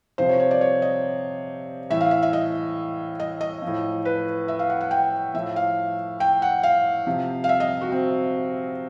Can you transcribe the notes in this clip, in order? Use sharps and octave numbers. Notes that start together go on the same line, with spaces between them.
C3 F3 C5
C#5
C#5
D5
C#5
D#5
A2 E3 E5
F5
E5
E5
D#5
D#5
D#5
F3
A2
B4
E5
F5
F#5
F#5
G5
A2 F3 E5
F5
G5
F#5
F5
C3 F3
F5
E5
D#5
F#4
C4